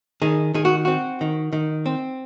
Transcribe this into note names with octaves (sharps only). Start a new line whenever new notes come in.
D#3 G#4
D#3 G#4
F#4
C4 F#4
D#3
D#3
C4